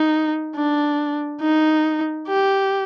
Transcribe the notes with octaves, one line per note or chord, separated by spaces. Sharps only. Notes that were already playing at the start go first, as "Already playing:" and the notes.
Already playing: D#4
D4
D#4
G4